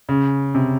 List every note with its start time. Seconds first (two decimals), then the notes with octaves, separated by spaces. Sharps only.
0.09 C#3
0.55 C3